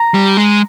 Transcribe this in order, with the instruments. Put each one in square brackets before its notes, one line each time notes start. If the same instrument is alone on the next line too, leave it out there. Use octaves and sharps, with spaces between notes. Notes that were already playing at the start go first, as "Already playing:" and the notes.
Already playing: [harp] A#5
[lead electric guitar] G3
G#3